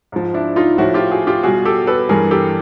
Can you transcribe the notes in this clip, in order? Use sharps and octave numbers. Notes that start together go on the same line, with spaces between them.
G#2 F3
D4 E4
D#4 F4
A2 F3 E4 F#4
F4 G4
F#4 G#4
F4 G4
B2 G3 F#4 G#4
G4 A4
A4 B4
G2 E3 G3 G#4 A#4
G4 A4